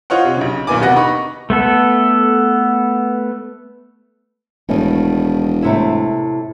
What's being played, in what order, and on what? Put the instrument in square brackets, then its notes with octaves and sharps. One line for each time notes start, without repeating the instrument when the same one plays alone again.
[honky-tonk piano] F4 C5 C#5 D#5 F#5
C3
B1 C#3
B1 A#2 D#3 B3 G#5 D6
A1 C3 B3 F#4 F#5 A#6
D#4 B5 C#6
[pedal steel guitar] A3 B3 A4
[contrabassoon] E1 [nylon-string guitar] A2 D#3
[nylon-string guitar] A2 C3 E4